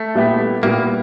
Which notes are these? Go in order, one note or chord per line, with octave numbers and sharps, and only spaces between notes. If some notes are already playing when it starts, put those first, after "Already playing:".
Already playing: A3
A#2 G3 B3 E4 G4
A#2 G3 A#3 B3 E4 G4